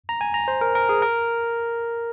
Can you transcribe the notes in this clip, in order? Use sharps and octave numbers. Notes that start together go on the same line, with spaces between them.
A#5
G#5
A#5
C5
A#4
A#4
G#4
A#4